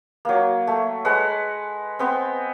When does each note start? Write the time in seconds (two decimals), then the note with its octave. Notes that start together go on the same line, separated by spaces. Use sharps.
0.25 F#3 A#3
0.67 A3
1.05 G#3 B4 F#5
1.99 B3 C4